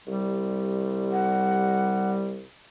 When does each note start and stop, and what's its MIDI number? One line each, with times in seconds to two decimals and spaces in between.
0.08 2.49 36
0.08 2.42 55
1.12 2.11 78